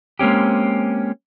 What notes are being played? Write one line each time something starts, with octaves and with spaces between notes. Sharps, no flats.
G#3 A#3 C4 C#4 G4